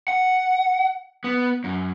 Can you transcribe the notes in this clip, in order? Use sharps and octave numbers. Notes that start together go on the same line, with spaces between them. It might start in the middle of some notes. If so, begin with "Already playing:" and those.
F#5
B3
F#2